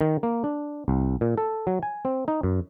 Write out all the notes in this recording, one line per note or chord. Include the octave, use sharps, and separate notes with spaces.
D#3
A#3
D4
C2
A#2
A4
F#3
G#5
C4
D#4
F#2